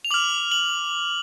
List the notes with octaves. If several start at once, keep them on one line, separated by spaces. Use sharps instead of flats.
F7
D6 F6 F#7
F#7